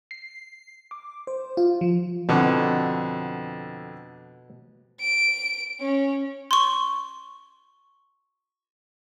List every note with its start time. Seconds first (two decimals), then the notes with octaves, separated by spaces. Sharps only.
0.11 C7
0.91 D6
1.27 C5
1.57 F4
1.81 F3
2.29 F2 B2 D3
5.01 D7
5.80 C#4
6.51 C6 C#6